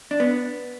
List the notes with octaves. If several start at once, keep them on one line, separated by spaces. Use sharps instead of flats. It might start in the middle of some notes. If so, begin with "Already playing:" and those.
D4
B3